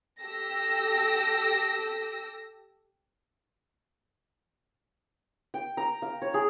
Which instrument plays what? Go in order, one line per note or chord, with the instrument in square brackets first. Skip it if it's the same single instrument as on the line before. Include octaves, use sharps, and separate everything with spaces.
[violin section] G4 A4 E6 A#6
[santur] G5
A#5
F5
C#5
G#4